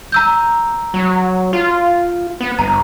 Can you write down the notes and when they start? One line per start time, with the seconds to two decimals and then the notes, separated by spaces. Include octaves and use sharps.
0.12 A#5 E6 G6
0.94 F#3
1.53 F4
2.41 B3
2.59 G1 A#5